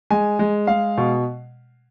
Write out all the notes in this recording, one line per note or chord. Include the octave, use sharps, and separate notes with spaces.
G#3 G#5
G#3
G#3 F5
B2